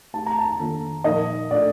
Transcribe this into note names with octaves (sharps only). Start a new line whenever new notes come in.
A3 D#4 G4 A5
A#5
A5
D#3 A#3 D4 F4 A4
A#2 F3 A#3 D#4 A#4 D#5
A2 A3 D4 F4 A4 D5